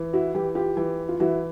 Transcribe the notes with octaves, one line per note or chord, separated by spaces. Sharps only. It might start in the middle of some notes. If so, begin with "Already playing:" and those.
Already playing: E3
E4 F#4
E3 G4
F4 G4
E3
F4
E3 E4 F#4